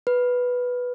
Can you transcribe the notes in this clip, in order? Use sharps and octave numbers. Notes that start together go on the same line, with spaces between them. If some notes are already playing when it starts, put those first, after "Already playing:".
B4